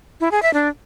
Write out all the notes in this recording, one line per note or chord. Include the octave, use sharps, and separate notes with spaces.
E4
G#4
E5
D4